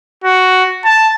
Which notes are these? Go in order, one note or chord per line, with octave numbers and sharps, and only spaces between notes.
F#4
A5